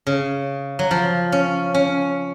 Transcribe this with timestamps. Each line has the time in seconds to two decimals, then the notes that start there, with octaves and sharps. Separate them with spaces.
0.07 C#3
0.79 F#3
0.91 F3
1.32 C#4
1.74 C#4